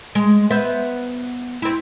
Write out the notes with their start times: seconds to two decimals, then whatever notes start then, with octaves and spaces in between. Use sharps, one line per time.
0.15 G#3
0.51 B3 C5 E5
1.62 C4 E4